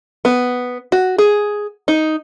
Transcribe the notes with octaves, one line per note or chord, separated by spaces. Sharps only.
B3
F#4
G#4
D#4